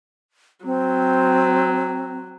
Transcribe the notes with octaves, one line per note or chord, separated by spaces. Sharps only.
F#3 C4